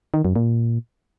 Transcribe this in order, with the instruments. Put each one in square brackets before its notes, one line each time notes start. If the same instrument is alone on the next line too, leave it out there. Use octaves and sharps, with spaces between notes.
[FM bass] D#3
F#2
A#2